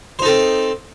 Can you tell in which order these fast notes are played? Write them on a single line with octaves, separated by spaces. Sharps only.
C5 D#4 A4 C4